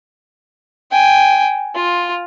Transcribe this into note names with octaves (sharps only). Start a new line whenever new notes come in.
G5 G#5
F4